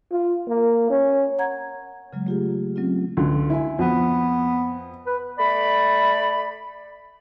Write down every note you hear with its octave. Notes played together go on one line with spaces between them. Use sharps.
F4
A#3
C#4
F#5 A#5 G#6
C#3 F#3 G#3
A3 F4 G4 G#4
F#3 C4 C#4 F4
C#2 D3
E4 G#5
F2 B3
B4
A3 D5 B5